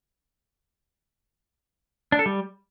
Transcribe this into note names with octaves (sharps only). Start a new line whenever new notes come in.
D4
A4
G3